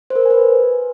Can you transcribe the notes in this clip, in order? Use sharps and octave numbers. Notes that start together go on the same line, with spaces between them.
C5
A#4
C5
G#5
B4